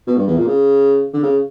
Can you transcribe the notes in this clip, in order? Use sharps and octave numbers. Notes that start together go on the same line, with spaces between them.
B2
G2
E2
A#2
C#3
D3
C#3